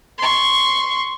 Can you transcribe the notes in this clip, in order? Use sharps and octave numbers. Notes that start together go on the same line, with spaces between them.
C6 C#6